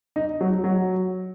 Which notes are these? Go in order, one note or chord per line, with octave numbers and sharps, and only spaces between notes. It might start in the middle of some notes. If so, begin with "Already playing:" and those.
D#4
F#3
F#3